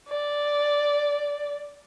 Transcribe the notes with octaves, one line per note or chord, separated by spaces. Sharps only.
D5